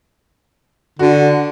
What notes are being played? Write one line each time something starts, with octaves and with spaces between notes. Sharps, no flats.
D3 F#4